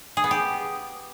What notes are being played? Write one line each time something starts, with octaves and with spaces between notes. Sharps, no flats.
G#4
B3
G4